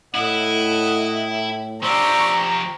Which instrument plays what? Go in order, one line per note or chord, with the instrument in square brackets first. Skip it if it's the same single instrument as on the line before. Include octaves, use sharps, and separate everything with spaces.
[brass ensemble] A2 [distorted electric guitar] E4 [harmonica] D#5 F#5
[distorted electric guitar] F3 G4 [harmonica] D4 C5 E6 [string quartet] A#5 C#6